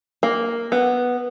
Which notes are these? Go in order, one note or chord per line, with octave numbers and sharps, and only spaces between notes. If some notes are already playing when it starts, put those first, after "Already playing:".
A#3
B3